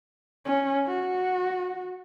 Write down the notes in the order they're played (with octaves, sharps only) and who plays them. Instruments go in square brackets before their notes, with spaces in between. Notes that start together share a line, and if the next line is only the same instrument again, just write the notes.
[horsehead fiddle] C#4
F#4